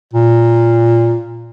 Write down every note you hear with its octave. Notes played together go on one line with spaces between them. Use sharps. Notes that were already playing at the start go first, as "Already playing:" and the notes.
A#2